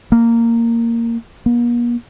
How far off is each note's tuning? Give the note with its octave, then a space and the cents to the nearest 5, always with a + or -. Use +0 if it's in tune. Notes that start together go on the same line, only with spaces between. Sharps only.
A#3 -10
A#3 +45